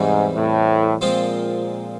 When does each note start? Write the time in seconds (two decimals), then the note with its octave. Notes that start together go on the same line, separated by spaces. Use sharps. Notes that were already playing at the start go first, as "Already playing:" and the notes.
Already playing: E2 G#2 C3 E3 G3 C4
0.35 A2
1.01 A#2 F3 G#3 C4 F4